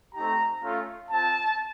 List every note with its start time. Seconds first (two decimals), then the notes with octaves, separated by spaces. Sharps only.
0.14 A3 C4 D#4 G4 A#5
0.62 A3 C#4 F4
1.11 C4 F4 A5